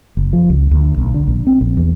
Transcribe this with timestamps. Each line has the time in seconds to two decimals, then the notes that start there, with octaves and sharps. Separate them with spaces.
0.17 F#1
0.33 F3
0.50 C#2
0.71 D2
0.98 B1
1.14 D3
1.27 A#1
1.47 C4
1.61 A#1
1.77 E2